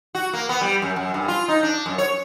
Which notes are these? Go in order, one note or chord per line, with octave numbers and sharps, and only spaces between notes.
F#4
A#3
B3
G3
F#2
F#2
G2
F4
D#4
D4
F#2
C#5